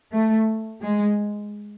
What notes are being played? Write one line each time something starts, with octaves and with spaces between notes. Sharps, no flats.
A3
G#3